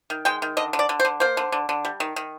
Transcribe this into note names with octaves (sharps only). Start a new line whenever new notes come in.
D#3
G#3 G5
D#3
D3 D#5
D3
D5
D3
C5
D3
A#3 C5
D3
D3
D3
G3
D#3
D#3